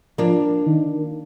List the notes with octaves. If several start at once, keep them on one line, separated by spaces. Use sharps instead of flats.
F3 A#3 D4
D#3